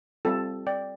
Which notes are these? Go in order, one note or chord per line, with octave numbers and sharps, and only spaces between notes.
G3 C4 F4 A4
D5 G5